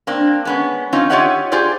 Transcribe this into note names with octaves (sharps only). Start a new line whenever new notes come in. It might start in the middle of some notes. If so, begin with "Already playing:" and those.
A#3 C4 D4
G#3 B3 C#4
C4 C#4 D#4 F4
F4 G4 C#5 D#5 E5 F#5
F4 G4 G#4 C5 D5